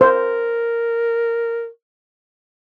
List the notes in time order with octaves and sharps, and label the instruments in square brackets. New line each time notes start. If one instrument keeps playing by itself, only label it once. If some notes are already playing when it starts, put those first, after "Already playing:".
[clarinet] A#4 [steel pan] C5